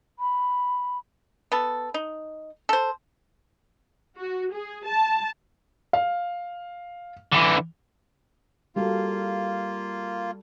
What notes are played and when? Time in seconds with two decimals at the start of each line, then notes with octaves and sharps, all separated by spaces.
0.19 B5
1.52 B3 A4
1.94 D#4
2.69 A4 C5
4.18 F#4
4.53 G#4
4.86 A5
5.93 F5
7.32 D3 E3
8.76 G3 A#3 F4 F#4 A4